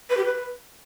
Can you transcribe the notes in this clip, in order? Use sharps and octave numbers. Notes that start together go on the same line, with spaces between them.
B4
G4
B4